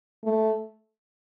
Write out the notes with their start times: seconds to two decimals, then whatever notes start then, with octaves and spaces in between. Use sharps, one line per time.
0.24 A3